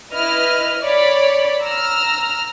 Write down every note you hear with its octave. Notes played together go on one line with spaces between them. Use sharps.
E4 B4 D#5 F6
C#5 D5 B5
A#5 E6 F6